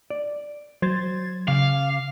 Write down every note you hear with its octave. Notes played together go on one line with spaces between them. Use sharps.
D5
F#3 C5 G#6 A6
C#3 F5 D6